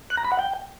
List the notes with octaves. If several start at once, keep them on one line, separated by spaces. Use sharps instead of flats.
F#6
A#5
B5
F#5
G5